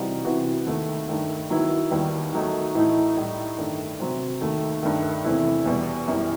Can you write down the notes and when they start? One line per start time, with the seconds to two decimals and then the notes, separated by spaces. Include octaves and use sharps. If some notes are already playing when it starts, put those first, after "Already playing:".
Already playing: C3 E3 G3 D#4 F#4
0.25 C3 E3 B3 F#4
0.67 D#2 D#3 A3
1.08 G2 D#3 A3
1.50 D#3 F#3 B3 E4
1.91 D#2 D#3 G3 B3
2.33 D#3 F#3 A3 D#4
2.75 A2 E3 A3 D#4
3.16 A2 G3 D#4
3.58 G2 D#3 A3
4.00 C3 F#3 C4
4.41 D#2 D#3 A3
4.82 G2 D#3 A3
5.24 E2 C3 E3 A3 E4
5.66 E2 B2 G3
6.08 F#2 E3 G3